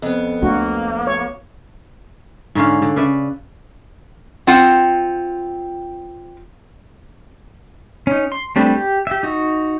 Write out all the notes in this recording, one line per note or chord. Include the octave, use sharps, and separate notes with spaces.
F2 B3
C#2 A3 A#3 D4 F#4
C#5
G#2 D3 C#4 F5
D3
C#3 B4 D5 E5
C4 F4 F#5
C#4 D#4
C6
G3 A3 C4 D4 B4
G4
G4 E5
D#4 F#4